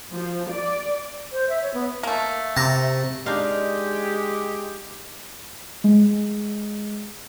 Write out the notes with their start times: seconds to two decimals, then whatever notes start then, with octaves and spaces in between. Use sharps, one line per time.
0.13 F3
0.52 D5
1.32 C5
1.49 E5
1.62 C#5
1.74 B3
2.03 A3 A#3
2.57 C3 A5 A#5
3.26 G#3 D4 D#4 G4 F5
5.84 G#3